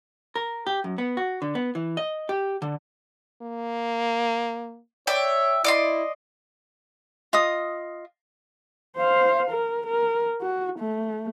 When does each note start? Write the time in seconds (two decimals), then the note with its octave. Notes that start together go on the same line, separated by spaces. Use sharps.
0.35 A#4
0.67 G4
0.84 F#2
0.98 B3
1.17 F#4
1.42 D3
1.55 B3
1.75 E3
1.97 D#5
2.29 G4
2.62 D3
3.42 A#3
5.07 C#5 D5 E5 G5
5.64 E4 D5 D#5 C6
7.33 F4 D#5 D#6
8.97 C5 F5
9.51 A#4
9.87 A#4
10.41 F#4
10.79 A3